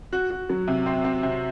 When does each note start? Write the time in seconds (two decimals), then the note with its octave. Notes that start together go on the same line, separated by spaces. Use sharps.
0.12 F#4
0.30 F#4
0.49 F#3
0.67 C3
0.86 C4
1.04 C4
1.23 C3